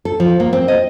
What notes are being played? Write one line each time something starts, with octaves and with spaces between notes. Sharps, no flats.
A4
F3
A#3
C4
D#5